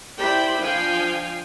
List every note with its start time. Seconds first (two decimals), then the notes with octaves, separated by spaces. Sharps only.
0.17 E4 G4 C5 D5 G5 B5
0.59 F3 D4 F5 G5 G#5